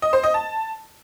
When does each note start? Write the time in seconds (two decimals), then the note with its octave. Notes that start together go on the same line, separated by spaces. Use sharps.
0.02 D#5
0.13 C5
0.24 D#5
0.34 A5